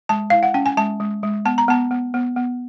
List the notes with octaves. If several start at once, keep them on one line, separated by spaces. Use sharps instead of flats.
G#3 A5
E4 F5
F#5
C#4 G5
G#5
G#3 A5
G#3
G#3
B3 A5
A#5
B3 A5
B3
B3
B3